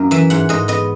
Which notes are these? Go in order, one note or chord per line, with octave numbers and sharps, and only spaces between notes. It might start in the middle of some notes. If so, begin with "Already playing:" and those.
Already playing: F#2 A#3
E3 E5
G#2 F#5
G#2 D#5
B3 D#5